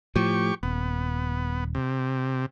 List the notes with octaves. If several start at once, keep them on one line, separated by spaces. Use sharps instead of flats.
A2 F3 G4 C#6
D#1 B3
C3